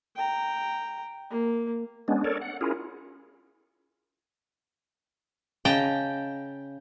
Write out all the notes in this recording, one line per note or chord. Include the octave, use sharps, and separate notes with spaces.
G5 A#5
A#3
G#3 B3 C#4 D4
A4 A#4 C#5 D5
F#5
C#4 E4 F4 G#4 A#4
C#3 D#5 G5 A5 A#5